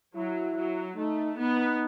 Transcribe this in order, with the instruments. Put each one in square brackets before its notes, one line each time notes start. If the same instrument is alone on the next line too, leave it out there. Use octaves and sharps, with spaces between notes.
[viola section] F#3 [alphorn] E4
[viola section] F#3
[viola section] A3 [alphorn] D#4
[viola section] B3 [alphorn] D#4